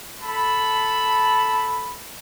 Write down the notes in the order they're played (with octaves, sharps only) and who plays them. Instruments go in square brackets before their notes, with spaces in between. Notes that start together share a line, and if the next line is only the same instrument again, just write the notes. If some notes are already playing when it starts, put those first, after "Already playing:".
[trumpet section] A4 A5 B5